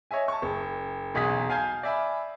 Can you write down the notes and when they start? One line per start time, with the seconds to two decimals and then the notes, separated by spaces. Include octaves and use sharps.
0.11 C#5 D#5 E5 G#5
0.28 A5 C#6
0.42 F#1
1.14 E1 B1 F#4 G#4 D#6 B6
1.50 F5 G#5 A5 G6 G#6 C7
1.83 D5 E5 G#5 B5